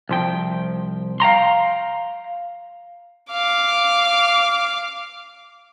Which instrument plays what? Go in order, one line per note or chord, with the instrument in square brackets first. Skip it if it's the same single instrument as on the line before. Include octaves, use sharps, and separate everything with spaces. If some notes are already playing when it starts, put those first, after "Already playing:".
[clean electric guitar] C2 F3 G5
F5 G5 A#5 C6
[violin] F5 D6